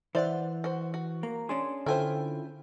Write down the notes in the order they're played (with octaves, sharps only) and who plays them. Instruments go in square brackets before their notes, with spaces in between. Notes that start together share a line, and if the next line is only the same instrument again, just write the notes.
[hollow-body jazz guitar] E3 [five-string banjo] C5 D5 [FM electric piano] E5 F#5
[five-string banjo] F#4 C5
F#4
[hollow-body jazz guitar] A#3 [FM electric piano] A#5
[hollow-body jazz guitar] C#4 D4 G#4 [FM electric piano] C6
[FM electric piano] D3 A4 G5 [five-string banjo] E4 F4 C5